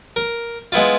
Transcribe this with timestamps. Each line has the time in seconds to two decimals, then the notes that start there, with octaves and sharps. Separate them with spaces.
0.16 A#4
0.72 G#3 B3 E4 F4